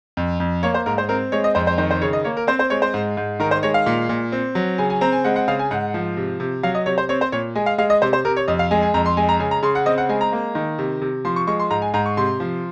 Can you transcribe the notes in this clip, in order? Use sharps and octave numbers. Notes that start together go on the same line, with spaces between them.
F2
F2
A#3 C#5
C5
G#2 A#4
C5
C4 A#4
G#3 C#5
D#5
F2 C5
C5
D#3 C5
C5
C#3 C#5
D#5
A#3 C#5
A#4
C4 C5
C5
G#3 C#5
C5
G#2
G#2
D#3 A#4
C5
G#3 C#5
F5
A#2
A#2
C4
F#3
C#3 G#5
G#5
C4 A#5
G#5
G#3 F#5
F#5
C#3 F5
G#5
G#2 F#5
F3
C3
C3
F#3 F5
D#5
C3 C#5
C5
C4 C#5
C5
A#2 C#5
G#3 G#5
F5
G#3 F5
D#5
C3 C5
C5
C3 A#4
C#5
F2 D#5
F5
G#3 G#5
G#5
F2 A#5
C6
G#3 G#5
A#5
C#3 G#5
A#5
C#3 C6
F#5
C4 D#5
F#5
G#3 G#5
A#5
A#3
D#3
C3
C3
F3 C6
C#6
G#3 C#6
C6
G#2 A#5
G#5
G#2 A#5
C#6
C3 C6
F3